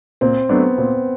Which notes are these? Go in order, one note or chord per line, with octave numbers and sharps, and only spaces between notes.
A#2 C4
F#3 A3 B3 D4
A#2 C4